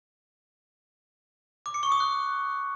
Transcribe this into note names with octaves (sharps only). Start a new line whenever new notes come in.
D6
C#7
C#6
D#6
F#6